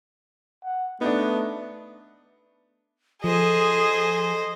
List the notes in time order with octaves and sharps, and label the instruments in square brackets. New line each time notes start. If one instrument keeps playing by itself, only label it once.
[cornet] F#5
[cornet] A3 [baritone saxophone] B3 [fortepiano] D4 D#4
[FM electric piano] F3 [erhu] G#4 [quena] A4 [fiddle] C5 D#5